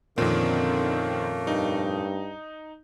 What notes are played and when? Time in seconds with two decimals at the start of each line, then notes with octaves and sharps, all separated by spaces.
0.18 F2 A#2 D3 D#3 A3 A#3 C4 C#4
1.47 G2 D#4